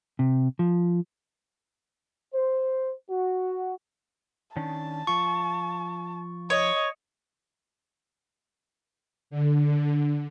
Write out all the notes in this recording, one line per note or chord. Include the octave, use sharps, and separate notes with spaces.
C3
F3
C5
F#4
D#3 C#4 D4 A5
F3 F4 C#6
C#5 D#5
D3